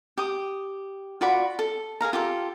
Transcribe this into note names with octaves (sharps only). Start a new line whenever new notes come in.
G4 D#6
F4 F#4 D5 B5
A4
G#4 A#4 F5 A#5
F4 G4 A4